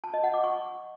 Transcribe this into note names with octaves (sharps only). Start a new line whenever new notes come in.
A5
D#5
F#5
D6
C#6